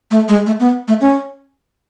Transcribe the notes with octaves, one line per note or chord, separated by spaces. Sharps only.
A3
G#3
A3
B3
A3
C#4